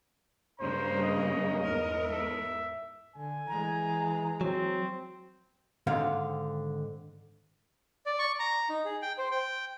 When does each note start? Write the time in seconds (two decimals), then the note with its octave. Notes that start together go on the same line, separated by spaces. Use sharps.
0.60 G2 C#3 A#3 C5 A#5
1.03 D#5
1.64 E2 G#2 A#4
2.05 E5
3.16 D3 G#5
3.48 E3 G#3 A#5
4.41 F#3 C4
5.87 G#2 D3 D#3 C4 F5
8.06 D5
8.19 C#6
8.39 A#5
8.69 D#4
8.85 G#4
9.02 G5
9.18 C5
9.31 G5